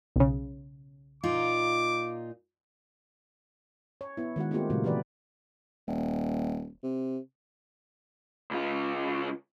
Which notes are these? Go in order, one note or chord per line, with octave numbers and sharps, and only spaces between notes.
B1 C#3
A#2 D#4 F4 D6
C#5
B3 E4
D#3 G#3 F#4 F#5
A3 A#3 C4 D#4 F4 G4
A#2 C#3 F#3 G#3 A3
E3 G4 B4 D5
D#1
C3
C#2 F4